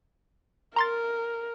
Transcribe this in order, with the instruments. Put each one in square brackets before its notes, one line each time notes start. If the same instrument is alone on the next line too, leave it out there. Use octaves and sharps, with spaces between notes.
[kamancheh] A#4 [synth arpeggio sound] A#5 C6 A6